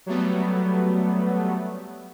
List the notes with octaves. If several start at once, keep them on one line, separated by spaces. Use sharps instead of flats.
F#3 G3 A3 B3